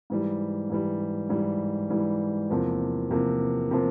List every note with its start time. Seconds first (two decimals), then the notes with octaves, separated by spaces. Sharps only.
0.10 G#2 E3 G3
0.70 G#2 E3 G3
1.29 G#2 E3 G3
1.90 G#2 E3 G3
2.50 E2 C3 F3 A#3
3.10 E2 C3 F3 A#3
3.71 C3 F3 A#3